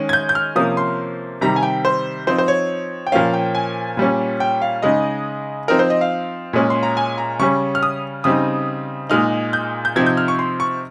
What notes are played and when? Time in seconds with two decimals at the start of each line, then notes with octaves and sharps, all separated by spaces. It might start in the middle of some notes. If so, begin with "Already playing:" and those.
Already playing: D#3 G#3 C#4
0.09 G#6
0.13 G6
0.29 G6
0.35 F6
0.56 C3 F3 A#3 C#4 D#6
0.77 C6
1.41 C3 D#3 G3 A#5
1.56 G#5
1.63 G5
1.85 C5
2.27 F3 C4 D#4 C5
2.38 C5
2.48 C#5
3.07 G5
3.12 A#2 F3 A#3 C#4 F5
3.34 G5
3.55 G#5
3.97 A#2 G3 C#4
4.40 G5
4.62 F5
4.82 C#3 G#3 D#4 D#5
5.68 F3 C4 D#4 A#4
5.79 C5
5.90 D#5
6.01 F5
6.53 A#2 G#3 C#4
6.70 C6
6.83 A#5
6.97 G#5
7.18 A#5
7.39 C#3 G3 C#4 C#6
7.75 F6
7.83 D#6
8.24 C#3 G3 C4 D#4 D#6
9.10 A#2 G#3 D#4 F6
9.53 G6
9.85 G6
9.96 C3 F3 C4 D#4 G#6
10.06 G6
10.17 F6
10.28 C#6
10.39 C6
10.60 C#6